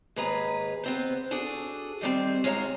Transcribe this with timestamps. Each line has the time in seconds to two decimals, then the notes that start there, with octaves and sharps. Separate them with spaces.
0.16 D#2 G#2 G#4 B4 A#5
0.84 B3 C4 C5
1.31 D4 F#4 G#4 A4
2.01 D#3 G3 C4
2.44 G#3 F4 C#5 F5 A#5